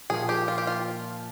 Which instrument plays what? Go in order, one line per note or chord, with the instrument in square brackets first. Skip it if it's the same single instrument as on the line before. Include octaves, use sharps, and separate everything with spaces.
[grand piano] A#2 F3 A#3 [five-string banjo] G#4
[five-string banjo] G4
F4
G4
F4